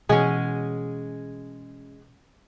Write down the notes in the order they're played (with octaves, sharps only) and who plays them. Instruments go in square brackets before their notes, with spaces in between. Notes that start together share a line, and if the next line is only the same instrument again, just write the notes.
[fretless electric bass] B2 E3 [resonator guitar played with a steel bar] G#3 [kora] C#4 F#4 G#4